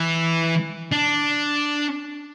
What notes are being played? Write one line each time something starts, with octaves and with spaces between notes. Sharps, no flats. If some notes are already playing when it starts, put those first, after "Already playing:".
Already playing: E3
D4